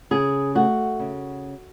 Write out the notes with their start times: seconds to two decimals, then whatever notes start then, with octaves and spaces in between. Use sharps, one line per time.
0.11 C#3 G#4
0.55 A3 F#4
0.99 C#3